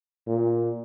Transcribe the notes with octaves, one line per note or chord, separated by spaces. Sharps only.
A#2